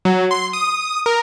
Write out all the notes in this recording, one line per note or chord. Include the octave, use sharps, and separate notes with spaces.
F#3
C6
D#6
A#4